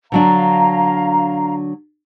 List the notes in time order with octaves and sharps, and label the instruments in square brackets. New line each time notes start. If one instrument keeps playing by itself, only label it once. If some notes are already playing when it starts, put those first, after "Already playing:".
[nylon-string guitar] D3 F#3 D4 [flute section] F5 A#5